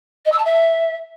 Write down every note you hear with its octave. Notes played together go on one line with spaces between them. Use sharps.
D#5
E6
A5
E5